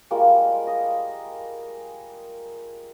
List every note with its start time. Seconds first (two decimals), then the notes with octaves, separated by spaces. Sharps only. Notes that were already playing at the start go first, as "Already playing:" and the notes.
0.11 G3 G#3 A#3 F4
0.67 D#5